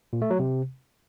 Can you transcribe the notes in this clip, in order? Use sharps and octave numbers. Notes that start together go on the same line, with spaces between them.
A#2
A3
F#3
C3